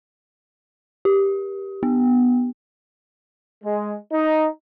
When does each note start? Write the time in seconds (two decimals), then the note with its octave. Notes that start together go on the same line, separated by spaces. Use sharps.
1.05 G4
1.83 B3
3.63 G#3
4.12 D#4